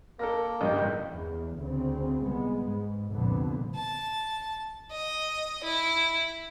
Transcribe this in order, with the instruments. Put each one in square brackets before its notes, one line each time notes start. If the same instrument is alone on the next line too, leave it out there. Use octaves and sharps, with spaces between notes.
[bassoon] A#3 [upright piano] A4 A#4 A#6
[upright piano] A1 G2 G6
G1 C#2 G#2
[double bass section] E2
D2 C#3 C4
C2 G#3 B3
G#2
C2 F2 A#2 D3 B3
[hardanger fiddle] A5
D#5
E4